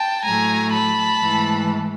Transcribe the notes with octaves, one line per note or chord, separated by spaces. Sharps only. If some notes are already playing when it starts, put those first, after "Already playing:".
Already playing: G5 A5
A2 F#3 A3 G#5 A#5
A5 B5
G#2 E3 A3